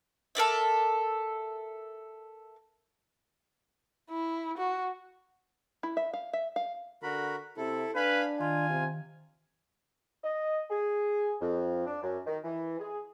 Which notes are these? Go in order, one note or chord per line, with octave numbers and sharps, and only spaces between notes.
A4 A#4 D5 E5
E4
F#4
E4
E5
F5
E5
F5
D3 F#4 A#4 B5
C3 E4 A4
D4 B4 F5 G#5 B5
D#3 F4 G#5 C6
C3
D#5
G#4
F2
D4
F#2
D#3
E3
G#4